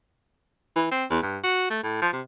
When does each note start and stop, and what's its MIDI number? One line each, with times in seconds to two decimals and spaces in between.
0.76 0.91 52
0.92 1.05 60
1.11 1.22 40
1.23 1.38 43
1.44 1.69 66
1.70 1.83 57
1.83 2.01 45
2.02 2.11 53
2.13 2.21 48